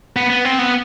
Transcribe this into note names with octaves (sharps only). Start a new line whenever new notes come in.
B3
B3
C4
B3